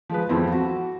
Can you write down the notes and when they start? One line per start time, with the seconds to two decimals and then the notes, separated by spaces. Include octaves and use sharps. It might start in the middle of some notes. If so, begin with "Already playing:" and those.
0.09 F3 G#3 B4
0.29 F2 F3 B3 C4 E4
0.52 F#4